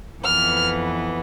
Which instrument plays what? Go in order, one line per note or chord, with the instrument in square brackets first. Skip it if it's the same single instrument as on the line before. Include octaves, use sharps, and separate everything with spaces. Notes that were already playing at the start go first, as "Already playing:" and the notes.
[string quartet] F2 E3 B3 F6